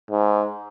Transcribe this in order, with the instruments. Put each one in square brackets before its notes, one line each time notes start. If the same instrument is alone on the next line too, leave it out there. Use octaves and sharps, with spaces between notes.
[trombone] G#2